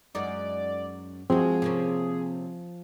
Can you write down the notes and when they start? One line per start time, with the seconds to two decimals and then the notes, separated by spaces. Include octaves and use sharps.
0.15 F#2 G#3 D#4 D5
1.30 F3 G#3 C4 F#4 G#4
1.62 C3 A#3 C#4